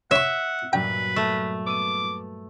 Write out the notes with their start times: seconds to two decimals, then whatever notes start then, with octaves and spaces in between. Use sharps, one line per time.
0.11 C#5 E5 F#5 C#6
0.73 G2 A#2 F#3 B4 G5
1.16 A3
1.67 B3 D6 E6 D#7